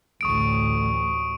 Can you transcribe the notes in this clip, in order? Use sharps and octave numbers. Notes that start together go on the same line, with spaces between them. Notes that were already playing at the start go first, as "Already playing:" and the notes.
A1 D2 A2 C#6 D#6 D7